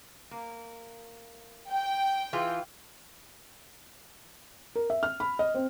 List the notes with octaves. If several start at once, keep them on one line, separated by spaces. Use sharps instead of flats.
A#3
G5
E3 F4 G#4
A#4
E5
F6
B5
D#5
C4